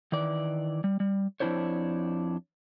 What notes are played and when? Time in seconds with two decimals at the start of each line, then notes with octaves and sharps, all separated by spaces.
0.12 D#3 E3 D5
0.84 G3
1.00 G3
1.40 F2 G#3 D4 E4 C5 C#5